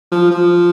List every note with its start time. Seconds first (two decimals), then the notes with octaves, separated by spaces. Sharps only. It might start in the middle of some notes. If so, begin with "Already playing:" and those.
0.12 F3
0.31 F3